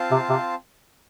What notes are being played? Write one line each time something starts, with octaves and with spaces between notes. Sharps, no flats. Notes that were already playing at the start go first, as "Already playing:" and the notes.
Already playing: C4 F4 C5 F5 A5
C3
C3